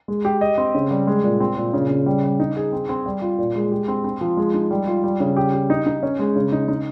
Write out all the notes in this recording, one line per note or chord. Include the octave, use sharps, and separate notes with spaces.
G#3
G4
D#5
C4
C#3
G3
G#3
A#2
C4
A#2
C#3
C#3
G3
G3
D#4
G#4
C4
C4
G3
F4
A#2
G#3
G4
C4
C4
F3
G#3
D#4
G3
F4
G3
C#3
G4
G4
D#4
D#4
C#4
G#3
C#3
D#4
D#4